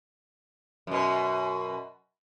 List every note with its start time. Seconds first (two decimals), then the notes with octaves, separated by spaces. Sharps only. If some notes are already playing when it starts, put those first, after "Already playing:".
0.87 F#2 B2